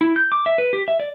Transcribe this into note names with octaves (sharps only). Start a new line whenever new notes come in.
E4
G6
D6
E5
B4
G4
E5
D5